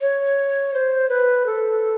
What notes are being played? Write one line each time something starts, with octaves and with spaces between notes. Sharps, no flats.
C#5
C5
B4
A4